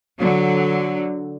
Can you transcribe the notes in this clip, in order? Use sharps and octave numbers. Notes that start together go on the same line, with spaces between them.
D3 F#3